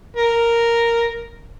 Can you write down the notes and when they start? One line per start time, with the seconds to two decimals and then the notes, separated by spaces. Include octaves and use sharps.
0.16 A#4